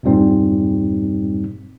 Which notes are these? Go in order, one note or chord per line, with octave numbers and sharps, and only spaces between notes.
E2 G2 A#2 G3 C4 D#4